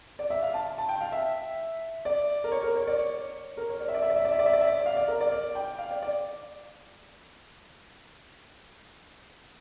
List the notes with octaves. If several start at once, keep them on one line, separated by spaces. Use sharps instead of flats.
D5
E5
F5
A5
A5
A5
G5
F5
E5
D5
A#4
C#5
A#4
C#5
D5
C#5
A#4
C#5
D5
E5
D5
E5
D5
E5
D5
E5
D5
E5
D5
E5
D5
F5
D5
A#4
D5
D5
G5
F5
D5
D5